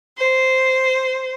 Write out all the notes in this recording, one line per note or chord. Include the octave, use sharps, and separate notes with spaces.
C5